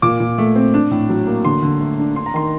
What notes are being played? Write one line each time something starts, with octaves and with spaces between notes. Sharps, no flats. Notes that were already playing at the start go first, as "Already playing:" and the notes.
A#2 D6
A#2
A3
C4
D4
A2
F#3
A#3
D3 C6
D3
A3
D4
D4 C6
A#5
D#3 C6